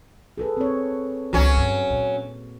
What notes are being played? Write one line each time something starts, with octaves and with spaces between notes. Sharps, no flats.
G#4 A4 B4
C4 C#5
C#2 F#3 C#4 F#4
G2
A#2